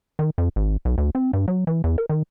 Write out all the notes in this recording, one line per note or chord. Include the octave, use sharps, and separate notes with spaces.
D#3
F2
G#1
B1
D2
C4
G2
F#3
E3
E2
A#4
D#3